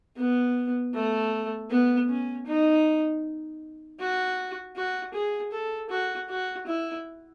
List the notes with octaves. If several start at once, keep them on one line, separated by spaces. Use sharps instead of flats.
B3
A3
B3
C#4
D#4
F#4
F#4
G#4
A4
F#4
F#4
E4